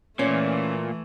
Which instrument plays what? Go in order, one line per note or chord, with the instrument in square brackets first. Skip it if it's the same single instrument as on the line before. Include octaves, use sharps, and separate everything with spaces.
[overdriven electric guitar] A#2 [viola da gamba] E3 A3 [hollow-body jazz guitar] C#4